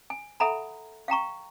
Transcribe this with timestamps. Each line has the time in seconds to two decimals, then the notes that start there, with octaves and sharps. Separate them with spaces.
0.10 G#5
0.40 A4 E5 F#5 G#5 A#5 B5
1.08 F5 G5 A#5 C#6